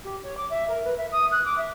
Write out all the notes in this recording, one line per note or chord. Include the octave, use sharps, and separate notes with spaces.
G4
C#5
D6
E5
A#4
B4
E5
D#6
F#6
D6
E5